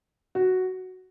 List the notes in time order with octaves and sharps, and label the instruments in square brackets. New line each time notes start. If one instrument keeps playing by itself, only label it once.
[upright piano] F#4